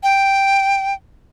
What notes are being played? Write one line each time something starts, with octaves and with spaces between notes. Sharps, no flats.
G5